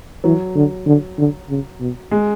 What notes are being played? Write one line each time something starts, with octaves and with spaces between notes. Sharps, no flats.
E3 F#3
D3
D3
D3
C#3
B2
G#3